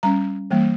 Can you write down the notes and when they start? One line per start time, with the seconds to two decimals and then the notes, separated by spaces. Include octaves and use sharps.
0.03 G3 C#4 A#5
0.51 E3 G3 A#3